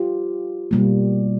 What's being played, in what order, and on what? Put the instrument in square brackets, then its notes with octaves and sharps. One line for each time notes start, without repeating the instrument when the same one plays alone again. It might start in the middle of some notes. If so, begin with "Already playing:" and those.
Already playing: [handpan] F4 G4
B2 G3 A#3